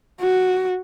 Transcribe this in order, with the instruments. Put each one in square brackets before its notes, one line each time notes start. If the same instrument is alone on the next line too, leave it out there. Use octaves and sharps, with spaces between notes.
[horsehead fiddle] F#4